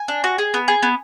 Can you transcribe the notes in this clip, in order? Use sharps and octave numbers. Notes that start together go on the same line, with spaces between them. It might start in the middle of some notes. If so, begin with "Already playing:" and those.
Already playing: G#5
D4
F#4
G#4
B3
G#4
B3